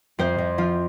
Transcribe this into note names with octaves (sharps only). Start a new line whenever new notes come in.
F2 C4 C5
F2
F3 F4